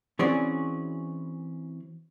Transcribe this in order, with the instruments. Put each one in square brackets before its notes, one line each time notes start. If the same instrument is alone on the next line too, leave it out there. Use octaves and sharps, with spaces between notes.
[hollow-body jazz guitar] E3 C4 C#4 F#4 G#4 D5